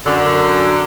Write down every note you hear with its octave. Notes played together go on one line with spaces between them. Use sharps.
F#2 D3